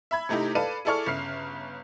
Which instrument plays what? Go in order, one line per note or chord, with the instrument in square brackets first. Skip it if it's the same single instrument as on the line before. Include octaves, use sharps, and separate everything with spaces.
[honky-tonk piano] E5 B5 G#6
C3 A3 D#4 E4 G4
A4 B4 D5 F5 A5 D#7
E4 G#4 A4 D5 C#6 F6
G1 C#3 F6 C7